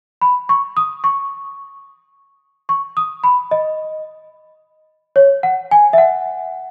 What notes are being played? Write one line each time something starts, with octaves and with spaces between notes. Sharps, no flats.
B5
C#6
D#6
C#6
C#6
D#6
B5
D#5
C#5
F#5
G#5
E5
F#5